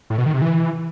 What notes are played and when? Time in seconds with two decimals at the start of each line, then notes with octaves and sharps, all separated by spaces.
0.10 A2
0.18 B2
0.26 D#3
0.34 C3
0.42 E3